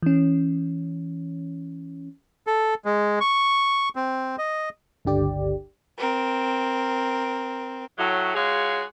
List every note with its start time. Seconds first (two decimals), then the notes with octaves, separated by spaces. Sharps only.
0.02 E3 C#4
2.47 A4
2.85 G#3
3.21 C#6
3.96 C4
4.38 D#5
5.05 G1 C#2 D3 G4 D5
5.98 C4 A#4
7.98 A2 F#3
8.35 G#3 F4 F#4 G#4 C#5